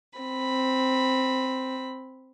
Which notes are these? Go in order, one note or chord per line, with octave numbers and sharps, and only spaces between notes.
C4 B5